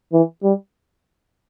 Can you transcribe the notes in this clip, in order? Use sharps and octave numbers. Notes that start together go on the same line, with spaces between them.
E3
G3